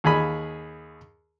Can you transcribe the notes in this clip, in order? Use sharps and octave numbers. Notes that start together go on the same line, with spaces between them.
D#2 G#4 G#5 B5